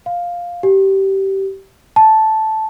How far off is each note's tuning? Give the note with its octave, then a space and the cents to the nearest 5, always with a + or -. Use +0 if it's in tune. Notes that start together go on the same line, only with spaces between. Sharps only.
F5 +5
G4 -20
A5 -5